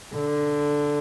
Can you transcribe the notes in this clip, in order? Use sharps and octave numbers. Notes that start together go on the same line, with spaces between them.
D3